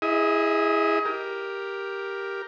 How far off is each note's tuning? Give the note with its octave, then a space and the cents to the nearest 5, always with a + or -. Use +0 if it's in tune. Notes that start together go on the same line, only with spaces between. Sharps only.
E4 +0 G#4 -10 D#5 +30
G4 +0 A#4 +5